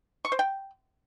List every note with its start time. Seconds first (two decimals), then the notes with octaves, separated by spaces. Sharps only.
0.25 C#6
0.32 C5
0.39 G5